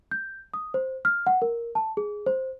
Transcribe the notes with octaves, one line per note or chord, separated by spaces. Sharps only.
G6
D#6
C5
F6
F#5
A#4
A5
G#4
C5